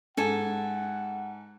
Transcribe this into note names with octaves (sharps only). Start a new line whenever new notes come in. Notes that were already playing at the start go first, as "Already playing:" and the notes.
G#2 A4 F#5 G#5